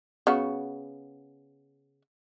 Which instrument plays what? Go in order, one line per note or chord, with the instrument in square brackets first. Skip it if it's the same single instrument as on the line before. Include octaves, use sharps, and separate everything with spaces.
[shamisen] C#3 B3 F#4